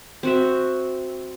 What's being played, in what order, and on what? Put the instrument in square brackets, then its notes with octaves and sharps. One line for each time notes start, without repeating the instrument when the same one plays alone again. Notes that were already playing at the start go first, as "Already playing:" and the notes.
[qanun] C4 F#4 E5